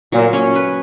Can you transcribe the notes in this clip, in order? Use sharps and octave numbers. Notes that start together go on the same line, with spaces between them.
A#2 F#3
C#4
B4